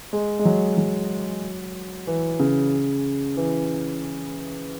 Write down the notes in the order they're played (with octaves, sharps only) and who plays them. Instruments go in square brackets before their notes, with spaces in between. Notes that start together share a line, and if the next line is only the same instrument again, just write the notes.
[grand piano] G#3
G#3
F#3
F#3
E3
C#3
E3